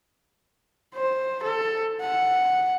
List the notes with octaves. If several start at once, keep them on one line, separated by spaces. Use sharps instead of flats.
C5
A4
F#5